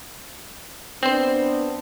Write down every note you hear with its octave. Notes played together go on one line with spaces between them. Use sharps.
B3 C4 D4 C5